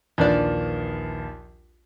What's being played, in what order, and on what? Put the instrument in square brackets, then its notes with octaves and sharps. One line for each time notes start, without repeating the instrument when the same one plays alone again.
[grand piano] A#1 D#2 F3 [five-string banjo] E3 D4 D5